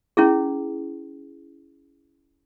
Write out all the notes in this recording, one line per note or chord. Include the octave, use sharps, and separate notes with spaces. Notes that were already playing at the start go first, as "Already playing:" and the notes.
C#4 E4 G#4